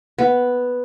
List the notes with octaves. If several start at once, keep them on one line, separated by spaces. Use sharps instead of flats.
B3